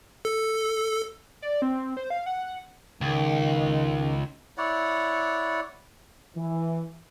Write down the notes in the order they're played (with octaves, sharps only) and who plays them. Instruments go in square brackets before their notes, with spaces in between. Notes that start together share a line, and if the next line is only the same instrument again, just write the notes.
[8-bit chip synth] A4
[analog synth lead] D5
C4
C5
F5
F#5
[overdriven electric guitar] C#2 [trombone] D#3
[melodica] E4 C#5 D5 F#5
[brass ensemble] E3